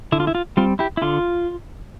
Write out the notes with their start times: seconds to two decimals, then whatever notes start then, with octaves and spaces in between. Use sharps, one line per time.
0.12 D3 E4
0.20 F4
0.27 E4
0.35 F4
0.57 G3 C4 F4
0.79 E4 G4
0.97 E4
1.02 D3 F4